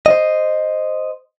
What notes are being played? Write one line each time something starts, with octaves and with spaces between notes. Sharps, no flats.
C5 D#5